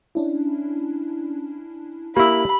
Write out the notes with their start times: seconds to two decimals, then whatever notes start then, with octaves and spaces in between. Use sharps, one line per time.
0.15 C#4 D4 E4
2.17 A#3 E4 G4 B5 E6